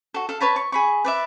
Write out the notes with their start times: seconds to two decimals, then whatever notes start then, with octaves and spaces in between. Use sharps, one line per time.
0.14 F#4 A4
0.29 A4 F5
0.40 B4 C#5 A5 B5
0.56 C#6
0.72 G#4 B5 C#6
1.05 B4 D5 E5